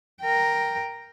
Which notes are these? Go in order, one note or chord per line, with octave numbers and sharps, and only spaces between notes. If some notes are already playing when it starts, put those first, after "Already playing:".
A#4 G5